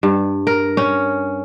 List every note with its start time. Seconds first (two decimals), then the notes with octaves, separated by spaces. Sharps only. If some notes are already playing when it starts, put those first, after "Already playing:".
0.03 G2
0.47 A#4
0.77 C#4